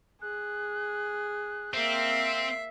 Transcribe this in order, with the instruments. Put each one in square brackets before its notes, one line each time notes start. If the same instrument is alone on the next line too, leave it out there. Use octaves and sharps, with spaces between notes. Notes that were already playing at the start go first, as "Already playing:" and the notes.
[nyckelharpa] G#4 [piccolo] F#6
[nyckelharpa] A#3 F5 [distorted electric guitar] C4 [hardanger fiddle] E5 [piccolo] C7